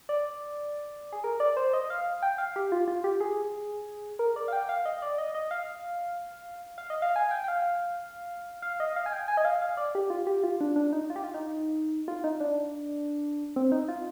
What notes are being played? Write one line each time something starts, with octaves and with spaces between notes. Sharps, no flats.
D5
G#4
A#4
D5
C5
D#5
F5
G5
F5
G4
F4
F4
G4
G#4
A#4
D5
F5
G5
F5
D#5
D5
D#5
D#5
F5
F5
D#5
F5
G#5
G5
G5
F5
F5
D#5
F5
G#5
G5
G#5
D#5
F5
F5
D5
G4
F4
G4
F4
D4
D4
D#4
F4
G4
F4
D#4
F4
D#4
D4
C4
D#4
F4